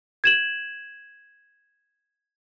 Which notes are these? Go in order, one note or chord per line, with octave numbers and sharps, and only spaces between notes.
G#6 E7 F#7